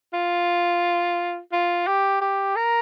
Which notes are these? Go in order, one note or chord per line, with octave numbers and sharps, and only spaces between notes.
F4
F4
G4
G4
A#4